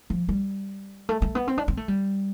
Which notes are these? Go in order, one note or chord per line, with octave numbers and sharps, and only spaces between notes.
F3
G3
A3
A3
B3
C4
D4
C4
A3
G3